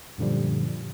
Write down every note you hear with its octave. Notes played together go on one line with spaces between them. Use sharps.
F#2 A#2 D3 F3 G3